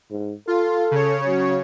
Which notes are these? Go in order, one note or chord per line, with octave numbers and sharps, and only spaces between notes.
G#2
F4 A4
C#3 C#5
F#3